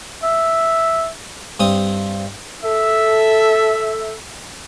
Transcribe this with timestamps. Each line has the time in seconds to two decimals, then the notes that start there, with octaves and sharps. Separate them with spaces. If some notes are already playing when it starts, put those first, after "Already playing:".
0.23 E5
1.60 G2 C4 D#6
2.64 A4 E5